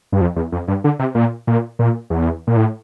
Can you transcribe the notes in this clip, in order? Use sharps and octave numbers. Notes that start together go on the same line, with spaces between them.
G2
F2
E2
F2
G2
D3
C3
A#2
A#2
A#2
E2
A#2
A2